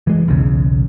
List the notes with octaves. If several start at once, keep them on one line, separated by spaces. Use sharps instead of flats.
E3 G#3
B1 E2 C#3